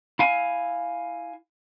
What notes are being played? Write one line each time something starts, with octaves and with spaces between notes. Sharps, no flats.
E4 F5 G#5